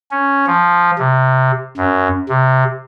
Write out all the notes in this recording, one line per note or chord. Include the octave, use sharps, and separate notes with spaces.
C#4
F3
C3
F#2
C3